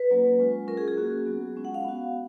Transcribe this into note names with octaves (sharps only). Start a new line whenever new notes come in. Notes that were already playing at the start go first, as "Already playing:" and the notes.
Already playing: B4
F#3 A#3 C#4 F4
G#3 C#4 F4
F#3 C#4 F4 A#4
G#4
G#4
A#3 C#4 F#4
F#3 B3 F#4
G#3 C#4 F4
F#5
F5
B3 F#4